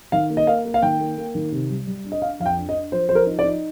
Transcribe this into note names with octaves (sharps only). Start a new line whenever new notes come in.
D#3 F5
A#3
D#5
A#3 F5
A#3
F5
D#3 G5
A#3
A#3
D#3
C3
G3
G3
D4
D#5
D4 F5
F2 F5
G5
D4
D#5
D4
F3 C5
F3 C5
A#4
D#4
D5
D#4